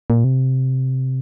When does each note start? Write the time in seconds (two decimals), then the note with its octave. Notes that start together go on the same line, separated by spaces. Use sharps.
0.10 A#2
0.24 C3